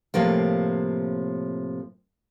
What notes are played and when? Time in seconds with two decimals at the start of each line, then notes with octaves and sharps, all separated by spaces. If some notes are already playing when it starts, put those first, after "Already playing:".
0.14 A2 C3 F3 A#3